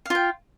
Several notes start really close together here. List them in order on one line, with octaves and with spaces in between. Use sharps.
F5 F4 G5